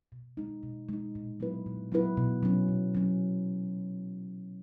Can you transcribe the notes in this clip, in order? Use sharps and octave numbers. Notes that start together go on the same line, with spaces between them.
B2
G#3 D#4
B2
G#3 D#4
A#2
F#3 B3 E4 B4
A#2
F#3 B3 E4 B4
B2
F#3 C#4
B2
F#3 C#4